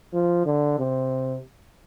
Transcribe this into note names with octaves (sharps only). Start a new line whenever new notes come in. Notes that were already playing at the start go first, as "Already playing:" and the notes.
F3
D3
C3